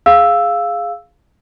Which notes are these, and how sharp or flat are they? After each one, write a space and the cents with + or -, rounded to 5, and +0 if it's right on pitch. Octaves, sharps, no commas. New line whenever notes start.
G#4 +0 F5 +0 E6 +0